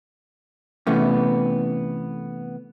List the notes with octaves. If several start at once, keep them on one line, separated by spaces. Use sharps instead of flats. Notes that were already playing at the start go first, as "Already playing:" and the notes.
C3 E3 A3 B3 C#4